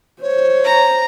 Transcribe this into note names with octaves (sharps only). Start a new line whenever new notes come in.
C5 C#5
A#5